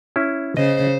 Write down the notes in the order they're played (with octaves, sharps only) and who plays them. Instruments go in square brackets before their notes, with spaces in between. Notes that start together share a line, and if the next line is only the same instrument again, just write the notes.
[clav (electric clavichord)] C#4 E4
[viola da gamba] C#3 C5 [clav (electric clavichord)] D#5